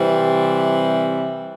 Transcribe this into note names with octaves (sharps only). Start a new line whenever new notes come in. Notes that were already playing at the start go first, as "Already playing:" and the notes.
Already playing: C3 E3 G3 C4